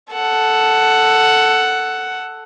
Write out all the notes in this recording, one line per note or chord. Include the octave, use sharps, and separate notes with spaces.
A4 F#5